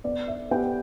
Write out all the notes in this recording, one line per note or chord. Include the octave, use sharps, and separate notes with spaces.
B3 D5
E5
B3 G4 G5